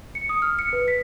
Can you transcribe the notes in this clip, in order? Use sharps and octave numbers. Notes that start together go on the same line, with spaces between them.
C#7
D#6
F6
C#7
B4
B6